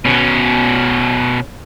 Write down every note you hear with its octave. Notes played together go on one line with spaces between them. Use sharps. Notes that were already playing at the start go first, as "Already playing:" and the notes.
B2 C#4